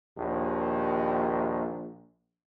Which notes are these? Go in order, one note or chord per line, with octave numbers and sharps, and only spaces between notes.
A#1 D#2